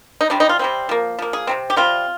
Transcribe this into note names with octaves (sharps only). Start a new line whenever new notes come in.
D#4
C3 G3 C4 D4
D#4
F4
C3 G3 C4
F3 A#3
F3 A#3
G#4
C3 G3 C4
G4
C3 G3 C4 F4